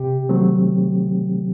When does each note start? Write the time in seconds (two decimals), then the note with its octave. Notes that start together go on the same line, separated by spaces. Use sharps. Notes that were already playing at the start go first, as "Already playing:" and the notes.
Already playing: C3 G4
0.29 D#3 F#3 A3 C4